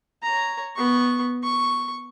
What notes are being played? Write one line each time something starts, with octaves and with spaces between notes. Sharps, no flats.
C#5 A#5
B3 C#6
C#6